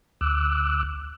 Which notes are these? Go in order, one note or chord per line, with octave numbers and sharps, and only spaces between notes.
D2 D6 E6 F#6